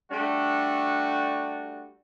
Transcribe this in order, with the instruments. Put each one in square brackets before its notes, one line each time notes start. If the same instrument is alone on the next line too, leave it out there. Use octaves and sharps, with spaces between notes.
[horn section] G3 A3 D4 F#4